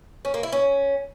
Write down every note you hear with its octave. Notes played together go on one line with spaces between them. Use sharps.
C#4
A#3
E4
C#4